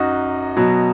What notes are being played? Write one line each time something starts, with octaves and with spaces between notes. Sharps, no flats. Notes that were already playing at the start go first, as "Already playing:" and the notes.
Already playing: F#2 D#4 F#4
B2 F#3